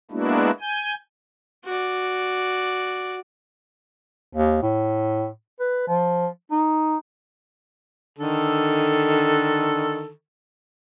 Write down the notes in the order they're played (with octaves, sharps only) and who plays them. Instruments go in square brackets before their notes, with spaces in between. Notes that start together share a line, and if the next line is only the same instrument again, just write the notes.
[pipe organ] G#3 A#3 B3 D4 E4 F#4
G#5 G6
[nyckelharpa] F#4 D5
[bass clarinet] D#2
A2
B4
F3
D#4
[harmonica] D3 D#3 A4